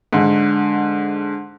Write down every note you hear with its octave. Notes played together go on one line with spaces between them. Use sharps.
G#2 D3